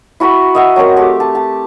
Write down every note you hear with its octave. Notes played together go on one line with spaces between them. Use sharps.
E4 F#4 A#5 B5
D#5 E5 F#5
F#3 C4 A#4 A#5
A3 G4 D6
A5
A5